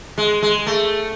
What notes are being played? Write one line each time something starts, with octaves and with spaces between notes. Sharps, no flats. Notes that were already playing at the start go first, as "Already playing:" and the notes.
G#3
G#3
A3